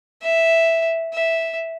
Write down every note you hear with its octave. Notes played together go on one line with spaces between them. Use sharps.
E5
E5